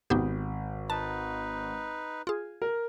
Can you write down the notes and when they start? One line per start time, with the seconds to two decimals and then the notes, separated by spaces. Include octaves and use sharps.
0.10 G#1 B3 D#4 G4
0.90 D#4 B4 A5
2.27 F4 G#4
2.62 A#4